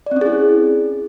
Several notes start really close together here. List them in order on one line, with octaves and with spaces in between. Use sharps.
D5 C4 C#4 G#4 E4